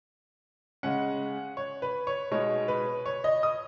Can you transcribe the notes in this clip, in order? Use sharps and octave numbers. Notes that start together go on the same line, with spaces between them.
C#3 G#3 C#4 F#5
C#5
B4
C#5
B2 G#3 B3 D#4 C#5
B4
C#5
D#5
D#6